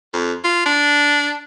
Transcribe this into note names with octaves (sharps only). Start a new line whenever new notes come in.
F2
F4
D4